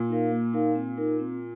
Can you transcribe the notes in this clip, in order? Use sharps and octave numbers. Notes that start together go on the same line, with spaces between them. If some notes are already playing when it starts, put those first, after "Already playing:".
Already playing: A#2
D#4 A#4 F5
A#3
D#4 A#4 F5
C4
D#4 A#4
C4